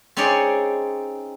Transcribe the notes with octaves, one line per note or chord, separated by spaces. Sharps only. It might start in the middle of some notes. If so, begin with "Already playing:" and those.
C4 C#4 D#4 G#4 C#5 D5